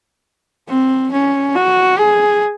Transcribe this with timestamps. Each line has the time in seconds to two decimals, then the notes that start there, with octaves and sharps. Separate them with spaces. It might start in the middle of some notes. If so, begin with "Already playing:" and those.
0.69 C4
1.12 C#4
1.56 F#4
1.98 G#4